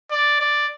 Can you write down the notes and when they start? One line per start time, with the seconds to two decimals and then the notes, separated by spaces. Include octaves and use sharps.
0.11 D5
0.41 D5